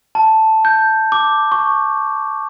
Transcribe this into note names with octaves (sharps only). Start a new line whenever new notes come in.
A5
G6
D6
C#6